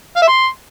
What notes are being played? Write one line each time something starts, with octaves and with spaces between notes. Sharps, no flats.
F5
E5
C6